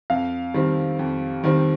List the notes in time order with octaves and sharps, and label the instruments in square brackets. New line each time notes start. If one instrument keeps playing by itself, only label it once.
[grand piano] F2 [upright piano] F5
[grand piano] D#3 G3 C4
F2
D#3 G3 C4